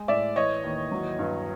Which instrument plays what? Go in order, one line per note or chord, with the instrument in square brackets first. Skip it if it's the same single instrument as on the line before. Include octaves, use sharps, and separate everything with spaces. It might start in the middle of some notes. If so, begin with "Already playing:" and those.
Already playing: [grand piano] G#3
A2 D5 E5
E3 C#5 D#5
D#2
F#3
G2